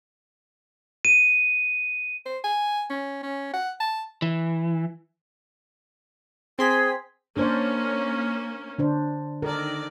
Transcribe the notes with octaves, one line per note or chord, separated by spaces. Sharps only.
D#7
C5
G#5
C#4
C#4
F#5
A5
E3
C4 G#4 C6 B6
A#3 C#4 D4 C5 D5
D3 D4 C5
D#3 A4 A#4 D5